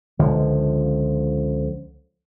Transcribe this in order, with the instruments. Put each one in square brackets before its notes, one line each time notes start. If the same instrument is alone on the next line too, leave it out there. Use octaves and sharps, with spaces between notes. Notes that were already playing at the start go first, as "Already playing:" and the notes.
[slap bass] C#2 D3 F3